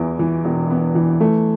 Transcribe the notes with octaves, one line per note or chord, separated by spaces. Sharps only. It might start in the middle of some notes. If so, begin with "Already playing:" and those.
Already playing: E2 E3
E3
E1
B3
E3
A3